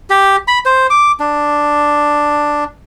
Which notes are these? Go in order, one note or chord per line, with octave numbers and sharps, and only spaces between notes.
G4
B5
C5
D6
D4